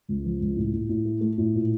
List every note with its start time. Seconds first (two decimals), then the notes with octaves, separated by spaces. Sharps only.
0.09 C#2
0.25 F3
0.41 C#2
0.57 A2
0.73 A2
0.89 A2
1.05 A3
1.21 A3
1.38 A2
1.54 A#2